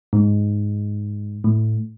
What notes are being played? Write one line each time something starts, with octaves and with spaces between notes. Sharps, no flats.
G#2
A2